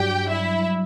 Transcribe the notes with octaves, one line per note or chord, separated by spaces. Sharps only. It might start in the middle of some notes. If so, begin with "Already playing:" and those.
Already playing: G2 F#3 D4 G4 G5
E4 E5